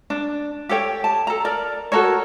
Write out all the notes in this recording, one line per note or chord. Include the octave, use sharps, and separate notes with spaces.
D4
G4 A4 C#5 G5
A5
A4 A#5
A#4 D5
F#4 A4 A#4 C#5